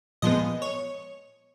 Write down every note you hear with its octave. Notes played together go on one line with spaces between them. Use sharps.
A#2 F3 G#3 B3 D#5
C#5